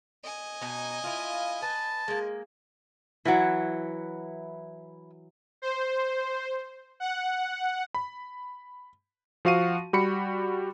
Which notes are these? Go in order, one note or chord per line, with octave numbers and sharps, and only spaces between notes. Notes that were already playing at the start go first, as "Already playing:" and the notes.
D#5 G#5
B2 D#4
E4 F4
B4 A5
G#3 A#3
E3 F#3 E4 F#5
C5
F#5
B5
F3 F#4 F5 C#6 D#7
G3 F#4 B5 C#7